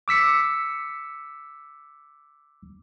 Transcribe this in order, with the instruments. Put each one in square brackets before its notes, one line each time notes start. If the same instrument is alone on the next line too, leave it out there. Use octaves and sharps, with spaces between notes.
[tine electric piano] D6 E6 B6 C#7